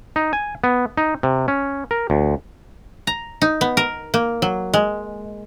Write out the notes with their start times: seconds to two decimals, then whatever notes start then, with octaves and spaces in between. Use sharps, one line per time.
0.16 D#4
0.33 G#5
0.64 B3
0.98 D#4
1.23 C3
1.48 C#4
1.91 A#4
2.10 D2
3.07 A#5
3.42 D#4
3.61 B3
3.77 A#4
4.14 A#3
4.42 F#3
4.74 G#3